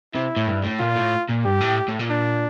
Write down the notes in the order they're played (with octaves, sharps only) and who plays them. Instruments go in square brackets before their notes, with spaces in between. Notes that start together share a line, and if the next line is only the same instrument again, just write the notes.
[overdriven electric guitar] C3 [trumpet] E4
[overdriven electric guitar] A2
G2
A2
[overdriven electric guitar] A#2 [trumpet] F4
[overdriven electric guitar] A2
A#2
[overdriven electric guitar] G2 [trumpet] G4
[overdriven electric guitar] A2
A2
A#2
[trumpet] D4